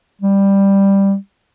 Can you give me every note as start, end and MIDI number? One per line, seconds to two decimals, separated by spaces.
0.22 1.15 55